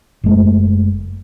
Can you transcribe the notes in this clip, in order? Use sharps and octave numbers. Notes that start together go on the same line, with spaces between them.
F#1 G#3 A3